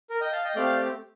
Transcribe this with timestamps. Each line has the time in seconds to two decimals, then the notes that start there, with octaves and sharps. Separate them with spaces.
0.10 A#4
0.21 D#5 G5
0.32 F5 A5
0.44 D#5 G5
0.55 A3 C4 G4 D5 F5